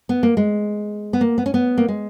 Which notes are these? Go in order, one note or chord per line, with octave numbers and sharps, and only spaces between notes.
B3
A#3
G#3
B3
A#3
B3
C#4
B3
A#3
G#3